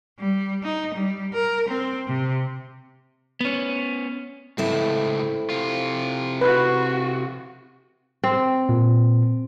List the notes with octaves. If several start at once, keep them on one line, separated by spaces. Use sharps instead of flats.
G3
D#4
G3
A#4
C4
C3
B3 C#4
C#2 A2 A3 C4 E4
C3 F4
F#4 B4
C4
A#2